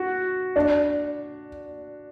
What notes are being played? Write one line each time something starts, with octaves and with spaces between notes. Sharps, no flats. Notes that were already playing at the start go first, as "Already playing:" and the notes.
Already playing: F#4
D4